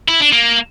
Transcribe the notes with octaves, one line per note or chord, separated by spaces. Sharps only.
E4
D4
A#3